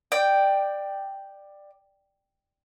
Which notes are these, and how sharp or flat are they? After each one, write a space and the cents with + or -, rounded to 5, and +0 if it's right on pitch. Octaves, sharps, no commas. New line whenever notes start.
D5 +15 G5 +0